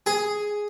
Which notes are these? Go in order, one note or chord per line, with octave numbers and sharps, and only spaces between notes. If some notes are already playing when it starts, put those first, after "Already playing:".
G#4